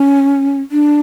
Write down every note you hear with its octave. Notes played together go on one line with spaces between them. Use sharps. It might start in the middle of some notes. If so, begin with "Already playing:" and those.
Already playing: C#4
D4